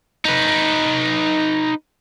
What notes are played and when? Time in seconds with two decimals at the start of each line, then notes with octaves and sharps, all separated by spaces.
0.25 D#4 B4